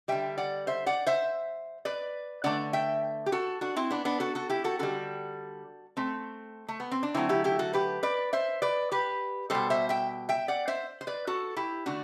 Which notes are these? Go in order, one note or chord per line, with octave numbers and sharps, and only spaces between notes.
D3 G3 E5 G5
D5 F#5
C5 E5
D5 F#5
C5 E5
B4 D5
D3 A3 D5 F#5
E5 G5
G4
F#4 A4
D4 F#4
C4 E4
B3 D4
B3 D4
F#4 A4
F#4 A4
E4 G4
F#4 A4
D3 G3 F#4 A4
A3 C4
A3
B3
C4
D4
D3 F#3 A3 C4 E4
E4 G4
E4 G4
F#4 A4
G4 B4
B4 D5
C5 E5
B4 D5
G4 B4
B2 G3 A4 C5
C5 E5
E5 G5
E5 G5
D5 F#5
C5 E5
C5
B4 D5
F#4 A4
E4 G4
D3 A3 D4 F#4